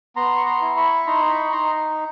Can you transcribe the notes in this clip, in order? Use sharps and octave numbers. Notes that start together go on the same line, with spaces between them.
B3 A#5 C6
C#6
A#5 C6
E4
B5 C#6
D#4 A#5 C6
B5 C#6
D#4 A#5 C6